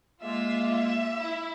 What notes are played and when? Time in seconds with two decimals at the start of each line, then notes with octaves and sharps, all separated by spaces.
0.23 G#3 A#3 F4 E5
0.71 E5
1.20 E4